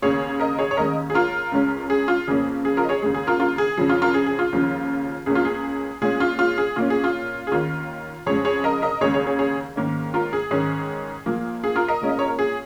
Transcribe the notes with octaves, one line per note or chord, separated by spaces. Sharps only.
D#2 C#3 A#3 G#4 C#5
A#4 D#5
G#4 C#5
C#5
D#2 D#3 G#3 C#4 A#4 D#5
G#4
F4 A#4
C#2 C#3 G#3 C#4
G#4
F4
F2 C#3 A#3 C#4 G#4
G#4
F4 A#4
D#5
G#4 C#5
D#2 C#3 G#3 G#4
G#4
F4 A#4
F4 A#4
G#4
F2 C#3 F3 G#4
F4
F4 A#4
G#4
G#4
F4
D#2 C#3 F3 C#4
C#2 C#3 A#3 C#4 G#4
F4
G#4
A#2 G#3 C#4 G#4
F4
F4
G#4
A#2 A#3 C#4 F4
G#4
F4
G#4
D#2 D#3 C#4 F4
F2 C#3 G#3 G#4 C#5
G#4 C#5
A#4 D#5
A#4 D#5
D#2 C#3 G#3 G#4 C#5
G#4 C#5
G#4 C#5
G#4 C#5
G#2 D#3 A#3 C#4
F4 A#4
G#4
G#2 D#3 C#4 G#4
A#2 F3 A#3
G#4
F4 A#4
A#4 D#5
A#2 G#3 C#4
D#5
C#5
A#4
G#4